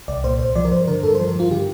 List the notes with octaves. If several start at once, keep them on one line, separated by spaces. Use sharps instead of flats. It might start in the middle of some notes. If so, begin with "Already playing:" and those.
C2 D5
A#2 C5
C2 C5
F3 D5
A#4
G2 C5
D3 A#4
G2 A4
A#4
C5
F3
A#4
G2 F4
D3 G4